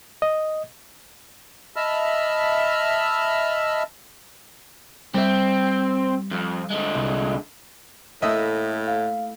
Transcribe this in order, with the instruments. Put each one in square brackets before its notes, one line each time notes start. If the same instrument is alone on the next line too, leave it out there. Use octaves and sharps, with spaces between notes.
[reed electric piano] D#5
[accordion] D#5 E5 A5 B5 E6 F6
[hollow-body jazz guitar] G3 E5 [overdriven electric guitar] C4
[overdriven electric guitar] F2
D3 G#3
[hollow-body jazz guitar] C2
[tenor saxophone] A2 [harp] A3 A#3 E4 [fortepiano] D#5 E5 D#6
[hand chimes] F5